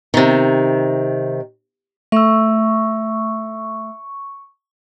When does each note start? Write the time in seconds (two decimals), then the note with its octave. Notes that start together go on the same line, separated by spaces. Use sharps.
0.14 C3 D#3
2.12 A3 E5 C#6 E6